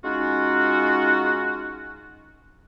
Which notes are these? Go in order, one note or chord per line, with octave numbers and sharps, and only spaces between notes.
G#3 C#4 D#4 F4 F#4